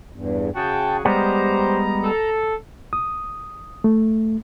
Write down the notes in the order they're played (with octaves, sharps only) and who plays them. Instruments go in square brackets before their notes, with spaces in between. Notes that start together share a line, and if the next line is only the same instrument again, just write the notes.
[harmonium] E2 G2
[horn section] C#3 F#4 G#4 [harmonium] G5 A5
[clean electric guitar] G3 G#3 B3 [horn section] G4 C5 [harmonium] A#5
[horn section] A4
[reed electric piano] D#6
A3